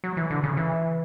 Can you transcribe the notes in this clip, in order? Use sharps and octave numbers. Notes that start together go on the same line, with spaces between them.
F#3
E3
D3
C#3
E3